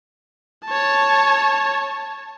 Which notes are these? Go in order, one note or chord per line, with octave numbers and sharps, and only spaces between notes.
C#5 A5